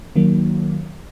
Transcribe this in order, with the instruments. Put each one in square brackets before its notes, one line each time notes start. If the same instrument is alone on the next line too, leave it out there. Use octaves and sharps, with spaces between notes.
[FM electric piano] D#3 F#3 A#3